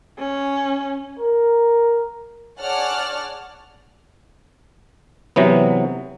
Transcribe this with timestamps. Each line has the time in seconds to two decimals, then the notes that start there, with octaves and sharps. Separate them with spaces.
0.18 C#4
1.19 A#4
2.59 G#4 C#5 D5 F#5 A5 F6
5.36 C3 E3 F#3 B3